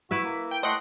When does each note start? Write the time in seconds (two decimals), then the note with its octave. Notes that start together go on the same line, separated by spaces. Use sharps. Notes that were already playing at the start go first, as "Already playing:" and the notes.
0.11 E4 F#4 B4 E5
0.24 A#3
0.51 G5
0.63 A3 D#5 F#5 C6